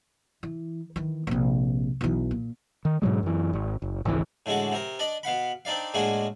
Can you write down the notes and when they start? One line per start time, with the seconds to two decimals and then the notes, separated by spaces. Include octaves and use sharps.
0.43 E3
0.96 D#3 E3
1.27 A#1 C3
2.01 B1 E3
2.31 A#2
2.85 D#3
3.02 G#2 B2 F#3 G#3
3.23 F#2 E3
3.53 G#1
3.82 F#1
4.05 G#1 C#2 C#3 E3
4.46 A2 D3 G#3 F#4 D6
4.72 C3 A#4
4.99 D4 D5 D#5
5.23 B2 F5 F#5 B5
5.65 C4 D4 D#4 D5 F5
5.94 A2 G#3 A#3 D4 F#4 G#4